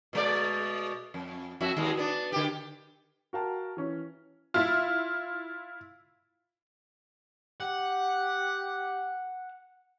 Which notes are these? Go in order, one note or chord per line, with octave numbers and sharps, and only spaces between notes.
B2 G#3 D5
F2
F2 F#4 E5
D#2 G#3
B3 D4
D3 G4
F#4 A#4 F5 G5 A5
E3 C#4
E4 F4
G4 F#5